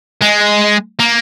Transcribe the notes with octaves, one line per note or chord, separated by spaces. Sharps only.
G#3
A#3